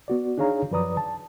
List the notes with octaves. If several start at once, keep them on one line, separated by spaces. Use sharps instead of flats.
B3 F#4 D5
D4 D#4 G#4 C#5 F5 A#5
F#2 F3 B4 D5 A#5 D#6
A5